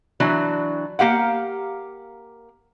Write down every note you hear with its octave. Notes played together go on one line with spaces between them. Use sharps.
E3 F#3 D4
A#3 G4 F5 F#5